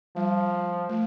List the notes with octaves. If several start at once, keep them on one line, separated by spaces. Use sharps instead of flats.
F3 G3
A3